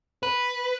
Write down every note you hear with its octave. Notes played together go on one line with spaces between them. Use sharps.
B4